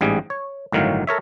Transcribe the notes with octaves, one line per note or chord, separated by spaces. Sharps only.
A1 G#2 G3 G#4
C#5
G1 A2 D#3 F#3 F5
A4 A#4 C#5 E5